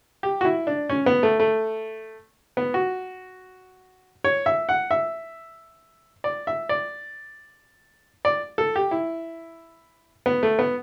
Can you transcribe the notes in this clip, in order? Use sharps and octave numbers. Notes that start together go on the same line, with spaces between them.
G4
F#4
E4
D4
C#4
B3
A3
A3
B3
F#4
C#5
E5
F#5
E5
D5
E5
D5
D5
A4
G4
E4
B3
A3
B3